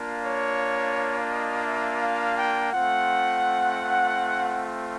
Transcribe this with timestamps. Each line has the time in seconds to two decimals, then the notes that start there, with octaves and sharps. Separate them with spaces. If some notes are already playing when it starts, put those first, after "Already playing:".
Already playing: A#3 D4 F4
0.21 C#5
1.29 D#5
1.66 E5
2.01 F5
2.38 G5
2.73 A3 C4 F4 F#5